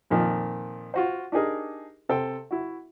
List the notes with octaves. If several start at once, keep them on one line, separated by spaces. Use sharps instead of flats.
F2 A#2 D#3 F3
F4 F#4 C5
D4 D#4 G4 G#4 A#4
C3 A4 C5 G5
E4 F#4